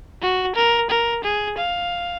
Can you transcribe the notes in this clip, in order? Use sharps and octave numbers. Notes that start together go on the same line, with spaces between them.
F#4
A#4
A#4
G#4
F5